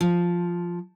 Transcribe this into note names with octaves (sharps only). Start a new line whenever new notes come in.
F3